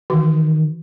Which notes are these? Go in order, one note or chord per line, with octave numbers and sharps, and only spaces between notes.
D#3 E3 F#4